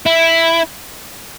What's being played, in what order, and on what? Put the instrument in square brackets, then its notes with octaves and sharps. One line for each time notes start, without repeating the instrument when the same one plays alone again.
[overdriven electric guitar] E4